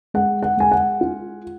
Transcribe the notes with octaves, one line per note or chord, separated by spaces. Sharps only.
G#3 F#5
F#5
G#3 G#5
F#5
F4